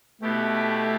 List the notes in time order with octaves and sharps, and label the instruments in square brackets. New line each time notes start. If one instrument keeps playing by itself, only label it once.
[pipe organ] B2 B3 E4 G4 [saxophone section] A3